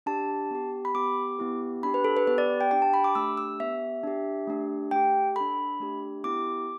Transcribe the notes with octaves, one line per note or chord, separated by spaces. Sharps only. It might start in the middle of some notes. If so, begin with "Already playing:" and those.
D4 G4 A5
B3 G4
B5
B3 G4 D6
B3 E4 G4
D4 G4 B5
B4
A4
B4
B3 G4 B4
D5
G5
D4 G4 G5
A5
B5
D6
A3 D4 G4 E6
E6
B3 G4 E5
D4 G4
A3 D4 G4
A3 G4 G5
D4 A4 B5
A3 D4 G4
B3 E4 G4 D6